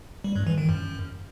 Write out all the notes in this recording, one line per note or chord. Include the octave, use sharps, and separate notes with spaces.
G3
G2
E3
D#3
F#2